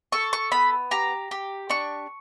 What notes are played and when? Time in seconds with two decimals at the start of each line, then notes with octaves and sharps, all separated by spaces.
0.12 A4 C#6
0.33 C#6
0.52 B3 B5
0.91 G4 A#5
1.31 G4
1.70 D4 C#6